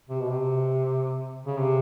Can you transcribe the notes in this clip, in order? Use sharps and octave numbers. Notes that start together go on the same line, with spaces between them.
C3
B2
C3
C#3
C3